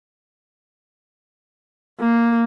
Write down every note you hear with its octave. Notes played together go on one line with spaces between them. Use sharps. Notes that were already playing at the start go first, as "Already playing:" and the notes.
A#3